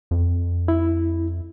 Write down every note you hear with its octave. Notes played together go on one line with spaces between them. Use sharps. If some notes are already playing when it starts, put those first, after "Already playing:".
F2
E4